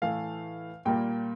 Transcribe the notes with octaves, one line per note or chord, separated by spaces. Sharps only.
A2 E3 A3 F5
A#2 G3 A#3 G5